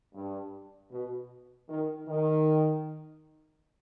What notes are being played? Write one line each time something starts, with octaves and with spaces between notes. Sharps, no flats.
G2
B2
D#3
D#3